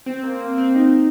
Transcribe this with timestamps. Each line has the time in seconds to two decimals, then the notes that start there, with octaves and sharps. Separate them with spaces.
0.06 C4
0.23 A#3
0.41 A#3
0.58 C4
0.75 D#4